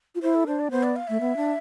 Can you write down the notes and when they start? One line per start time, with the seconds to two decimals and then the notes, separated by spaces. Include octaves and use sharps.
0.15 F4
0.22 E4 C5
0.35 A4
0.47 D4 C5
0.59 D5
0.71 B3 C5
0.83 D5
0.96 F5
1.07 A3 E5
1.21 B3
1.37 D4